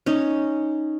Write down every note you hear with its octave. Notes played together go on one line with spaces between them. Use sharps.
C#4 D#4